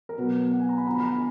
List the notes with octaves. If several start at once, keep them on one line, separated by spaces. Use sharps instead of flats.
A#4
B2 F#3 B3 B4
F#5
G#5
A#5
B5
D3 F3 B3 A#5
B5
A#5
G#5